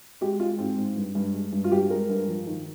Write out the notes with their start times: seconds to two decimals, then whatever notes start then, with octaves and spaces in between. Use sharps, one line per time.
0.21 G#3 G4
0.40 G#3 F4
0.58 G#2 C4
0.77 G#2
0.96 G2
1.15 G2
1.34 G#3
1.52 G2
1.64 F4
1.72 G2 G4
1.90 G#3 A#4
2.09 G2
2.28 F3
2.47 D#3